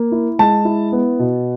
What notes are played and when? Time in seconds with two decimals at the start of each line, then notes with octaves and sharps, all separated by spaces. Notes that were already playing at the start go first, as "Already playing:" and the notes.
Already playing: A#3
0.12 E4
0.39 G#3 A5
0.65 E4
0.92 B3
1.19 B2